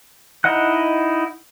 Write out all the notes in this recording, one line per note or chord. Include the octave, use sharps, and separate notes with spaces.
D#4 E4 D#5 F#5 F#6